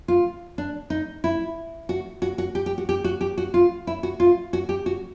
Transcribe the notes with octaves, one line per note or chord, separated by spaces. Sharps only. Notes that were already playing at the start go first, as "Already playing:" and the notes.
F4
D4
D#4
E4
F#4
F#4
F#4
G4
G4
F#4
G4
F#4
G4
F#4
F4
E4
F#4
F4
F#4
G4
F#4